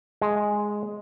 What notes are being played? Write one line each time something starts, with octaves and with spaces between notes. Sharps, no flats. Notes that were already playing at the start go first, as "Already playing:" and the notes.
G#3